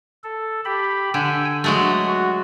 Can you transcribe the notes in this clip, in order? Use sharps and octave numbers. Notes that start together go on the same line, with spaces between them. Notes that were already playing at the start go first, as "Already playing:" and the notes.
A4
G4 B5
D3 G5 G#5 E6
F#3 G#3 A3 F#4
F#4